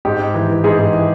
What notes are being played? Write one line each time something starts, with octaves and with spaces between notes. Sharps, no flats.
G#2 G4
G#2
E3
E3
G#2 G#4
G#2
E3